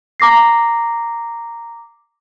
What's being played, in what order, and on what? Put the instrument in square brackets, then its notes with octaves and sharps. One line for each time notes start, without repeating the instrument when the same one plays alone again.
[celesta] A#5 D6 A#6 C7